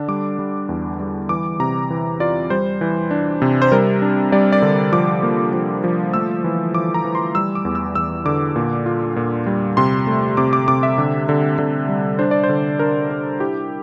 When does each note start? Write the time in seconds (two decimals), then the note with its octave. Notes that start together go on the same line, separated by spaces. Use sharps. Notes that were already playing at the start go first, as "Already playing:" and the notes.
Already playing: D3 D4
0.08 G3 D6
0.39 G3
0.69 E2
1.00 G3
1.29 E3 D6
1.60 C3 A#5
1.90 E3
2.20 F4 D5
2.50 G3 C5
2.81 E3
3.11 D4
3.42 C3
3.62 C5
3.72 G3 A#4
4.02 D4
4.32 G3 D5
4.52 D5
4.62 D3
4.92 F3 D6
5.23 A#3
5.53 F3
5.84 F3
6.14 A3 E6
6.44 E3
6.74 E3 D6
6.94 A#5
7.05 E3
7.15 C6
7.35 G3 E6
7.55 D6
7.65 E2
7.75 E6
7.95 E2 E6
8.25 D3 D6
8.56 A#2
8.86 F4
9.16 A#2
9.46 G3
9.77 C3 C6
10.07 A3
10.37 C3 D6
10.53 D6
10.68 C3 D6
10.83 E5
10.98 D3
11.29 D3
11.58 D3
11.89 G3
12.19 D4 C5
12.31 D5
12.43 C5
12.49 D3
12.79 D4 A#4
13.10 D4
13.40 E4 G4